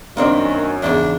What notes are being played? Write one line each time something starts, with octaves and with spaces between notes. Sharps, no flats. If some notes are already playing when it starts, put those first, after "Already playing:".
F#2 D#3 A#3 C4 D4
E2 G#2 C#3 D4